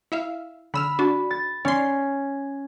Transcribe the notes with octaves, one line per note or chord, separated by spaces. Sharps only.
E4 E5 F5
D3 B5 E6 F6
D4 F#4
A6
C#4 D5 C6